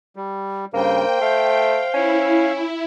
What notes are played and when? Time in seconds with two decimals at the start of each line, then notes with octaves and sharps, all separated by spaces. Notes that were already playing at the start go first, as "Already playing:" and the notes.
0.16 G3
0.74 G2 C#3 A#3 C5 G5
1.21 A3 F5
1.94 C#4 E4